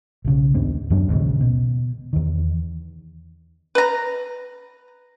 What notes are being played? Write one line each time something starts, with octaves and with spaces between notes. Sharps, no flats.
B1 C#3
D#2 G#2 B3 D4
F#2 E3 F#3 D4
A#1 D#2 G#2 C#3
B2
E2 D#3
B4 A#5